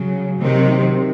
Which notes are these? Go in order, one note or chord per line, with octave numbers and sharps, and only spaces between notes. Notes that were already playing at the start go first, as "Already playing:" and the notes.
Already playing: C#3 F#3
C3 D#3 F#3 C4